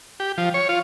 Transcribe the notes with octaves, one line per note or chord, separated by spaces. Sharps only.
G4
F3
C#5
F4